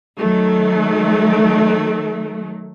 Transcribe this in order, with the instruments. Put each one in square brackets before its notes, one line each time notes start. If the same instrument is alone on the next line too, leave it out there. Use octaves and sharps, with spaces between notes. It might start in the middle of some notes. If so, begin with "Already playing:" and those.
[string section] D#3 F#3 A3